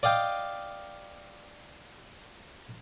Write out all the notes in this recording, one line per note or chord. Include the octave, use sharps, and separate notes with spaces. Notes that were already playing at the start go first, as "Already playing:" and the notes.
D5 D#5 F5 G5